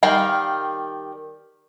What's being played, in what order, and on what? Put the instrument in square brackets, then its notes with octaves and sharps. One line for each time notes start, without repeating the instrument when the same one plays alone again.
[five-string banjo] D#3 G3 A#4 F5 G5